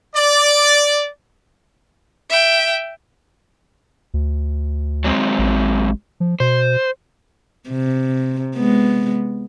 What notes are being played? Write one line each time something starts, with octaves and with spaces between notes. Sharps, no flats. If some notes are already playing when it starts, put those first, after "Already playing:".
D5
E5 G5
D2
F#3 G#3 C4
A1
F3
B2 C5
C3
G#3 B3